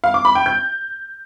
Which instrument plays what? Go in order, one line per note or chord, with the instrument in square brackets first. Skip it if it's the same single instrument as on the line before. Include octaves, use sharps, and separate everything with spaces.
[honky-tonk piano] F5
D6
B5
G5
G6